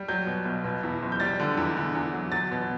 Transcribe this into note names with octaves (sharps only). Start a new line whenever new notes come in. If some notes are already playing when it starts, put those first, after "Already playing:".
Already playing: G3
F#3 G6
B2
B1
B2
E2
F#1
G6
G3 A6
D3
E2
D3
E2
F#3
F#3 A6
B2